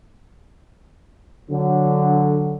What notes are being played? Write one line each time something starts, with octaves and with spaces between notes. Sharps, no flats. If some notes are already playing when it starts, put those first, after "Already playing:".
D3 F#3